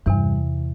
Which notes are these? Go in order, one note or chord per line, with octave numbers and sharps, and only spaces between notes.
E2 G2 C3 E3